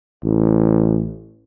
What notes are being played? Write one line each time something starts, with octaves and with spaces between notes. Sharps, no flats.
A1